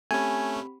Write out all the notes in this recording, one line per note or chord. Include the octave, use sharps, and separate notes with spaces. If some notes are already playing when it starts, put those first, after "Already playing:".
A3 C4 C#4 G4 G#5 B5